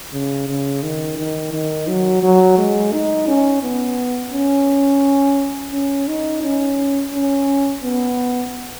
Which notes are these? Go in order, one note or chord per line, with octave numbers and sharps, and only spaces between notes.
C#3
C#3
D#3
D#3
D#3
F#3
F#3
G#3
D#4
C#4
B3
C#4
C#4
D#4
C#4
C#4
B3